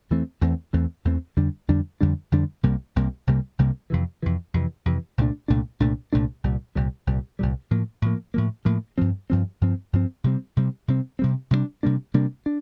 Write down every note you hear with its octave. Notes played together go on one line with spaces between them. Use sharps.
E2 E3 A3 C4
E2 E3 A3 C4
E2 E3 A3 C4
E2 E3 A3 C4
F2 D3 G3 D4
F2 D3 G3 D4
F2 D3 G3 D4
F2 D3 G3 D4
C2 C3 G3 A#3
C2 C3 G3 A#3
C2 C3 G3 A#3
C2 C3 G3 A#3
F2 C3 E3
F2 C3 E3
F2 C3 E3
F2 C3 E3
C2 A#2 A3 D4
C2 A#2 A3 D4
C2 A#2 A3 D4
C2 A#2 A3 D4
C2 A#2 G3
C2 A#2 G3
C2 A#2 G3
C2 A#2 G3
A2 F3 A#3
A2 F3 A#3
A2 F3 A#3
A2 F3 A#3
G2 F3 C4
G2 F3 C4
G2 F3 C4
G2 F3 C4
C3 G3 C4
C3 G3 C4
C3 G3 C4
C3 G3 C4
C3 G3 A#3 D4
C3 G3 A#3 D4
C3 G3 A#3 D4
D4